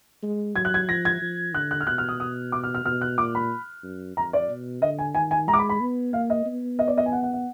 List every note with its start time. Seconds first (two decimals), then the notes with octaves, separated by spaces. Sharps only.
0.23 G#3
0.55 F#3 G#6
0.65 F#6
0.74 G#6
0.89 F3 A#6
1.05 G#6
1.22 F3
1.54 D3 F#6
1.71 F#6
1.80 F6
1.87 B2 F#6
1.98 F6
2.09 D#6
2.20 D#6
2.52 D6
2.63 F6
2.74 F6
2.85 B2 F6
3.01 F#6
3.18 A#2 D6
3.35 B5
3.83 F#2
4.17 F2 A#5
4.33 D5
4.49 B2
4.82 D3 D#5
4.99 G#5
5.15 D#3 G#5
5.31 G#5
5.48 G#3 A#5
5.54 D6
5.59 B5
5.69 B5
5.81 B3
6.13 A#3 F5
6.30 D#5
6.46 B3
6.79 D#5
6.88 D5
6.98 D#5
7.06 G#5
7.12 F#5
7.23 F#5
7.33 F#5